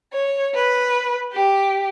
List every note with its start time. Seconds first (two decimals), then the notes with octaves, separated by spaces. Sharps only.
0.13 C#5
0.54 B4
1.32 G4